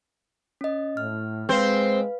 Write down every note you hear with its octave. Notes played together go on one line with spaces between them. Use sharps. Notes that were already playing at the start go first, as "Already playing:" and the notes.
C#4 D#5
A2 F6
G#3 C4 B4 C5 F5